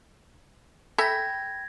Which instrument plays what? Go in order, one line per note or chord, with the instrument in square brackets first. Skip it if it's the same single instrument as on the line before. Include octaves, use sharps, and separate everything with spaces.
[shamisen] A4 E5 G#5 [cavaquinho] G5 B5 [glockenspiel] G#6 A#6